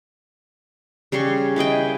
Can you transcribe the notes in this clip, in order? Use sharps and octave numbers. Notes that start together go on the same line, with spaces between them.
C#3 G3 C6 C#6
E4 B4 D#5 G5